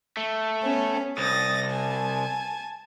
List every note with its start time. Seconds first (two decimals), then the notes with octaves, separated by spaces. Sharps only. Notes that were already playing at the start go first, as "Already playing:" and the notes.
0.17 A3
0.61 B3 C#4
1.18 C2 D#6 A6 A#6
1.68 G#5 A5